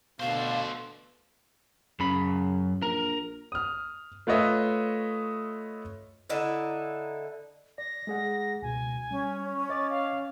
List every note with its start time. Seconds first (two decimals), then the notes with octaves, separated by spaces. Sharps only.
0.20 B2 D3 A3 D4 C5 F5
2.00 F#2 C#3 B5
2.82 A#1 A#4
3.52 D#6 F6
4.27 A3 F4 B4 C#5 D#5 E5
6.30 D3 D#4 E4
7.78 D5 A#6
8.07 G#3 G#4 F#5
8.62 C#2 B2 G#5
9.11 G3 C#4
9.69 C#5 D#5 D6 A6
9.90 F5